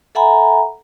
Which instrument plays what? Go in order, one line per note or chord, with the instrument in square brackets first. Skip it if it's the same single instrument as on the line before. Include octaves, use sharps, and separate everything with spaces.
[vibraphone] A4 E5 F#5 G#5 A#5 B5